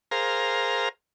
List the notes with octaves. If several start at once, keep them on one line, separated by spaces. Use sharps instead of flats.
G#4 A#4 C5 F5 A#5